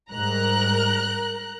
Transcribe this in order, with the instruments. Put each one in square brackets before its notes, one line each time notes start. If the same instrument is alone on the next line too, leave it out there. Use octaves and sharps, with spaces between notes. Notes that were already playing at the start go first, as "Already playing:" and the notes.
[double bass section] G#2 G3 [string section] A#4 A#5 F#6